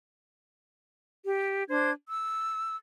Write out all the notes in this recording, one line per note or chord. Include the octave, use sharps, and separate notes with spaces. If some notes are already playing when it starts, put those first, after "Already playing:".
G4
D4 C5 G#6
E6